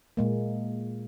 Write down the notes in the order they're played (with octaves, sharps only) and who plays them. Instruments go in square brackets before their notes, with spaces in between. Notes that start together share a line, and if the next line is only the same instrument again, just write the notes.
[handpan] A#2 G#3 A#3